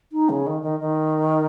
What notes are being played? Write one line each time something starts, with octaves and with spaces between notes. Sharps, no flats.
D#4
C#3
D#3
D#3
D#3